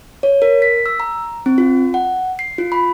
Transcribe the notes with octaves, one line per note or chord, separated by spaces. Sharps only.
C#5
A#4
B6
E6
A#5
C4
F4
F#5
C7
F4
B5